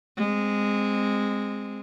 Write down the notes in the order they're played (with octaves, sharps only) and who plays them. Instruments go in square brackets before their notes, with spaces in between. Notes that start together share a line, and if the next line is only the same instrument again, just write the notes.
[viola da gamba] G#3 C4